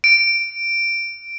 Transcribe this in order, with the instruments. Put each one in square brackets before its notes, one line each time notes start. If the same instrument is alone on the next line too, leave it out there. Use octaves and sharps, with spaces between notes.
[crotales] D7